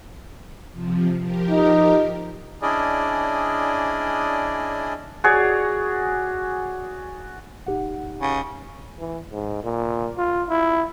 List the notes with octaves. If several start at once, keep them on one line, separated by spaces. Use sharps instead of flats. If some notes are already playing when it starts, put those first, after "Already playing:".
C3 F3
F3 G4 A#4
D#4
C#4 D4 E4 G#4 D5 D#5
F#4 G#4 C#5 D5
D1 D#4 G4 F#5
C#3
E3
G#2
A#2
F4
E4